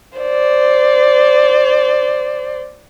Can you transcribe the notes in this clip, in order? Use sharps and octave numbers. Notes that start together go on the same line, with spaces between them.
C5 D5